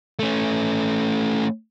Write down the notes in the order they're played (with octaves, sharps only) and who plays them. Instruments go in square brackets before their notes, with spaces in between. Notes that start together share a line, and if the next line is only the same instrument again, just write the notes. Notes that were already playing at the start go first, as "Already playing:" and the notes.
[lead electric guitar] A3 C#4